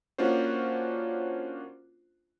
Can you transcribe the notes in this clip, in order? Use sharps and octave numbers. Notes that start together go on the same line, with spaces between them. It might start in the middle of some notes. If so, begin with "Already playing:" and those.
A#3 C#4 D4 F4 F#4 C5